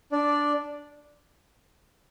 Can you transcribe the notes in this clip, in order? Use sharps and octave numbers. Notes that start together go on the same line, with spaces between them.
D4 D5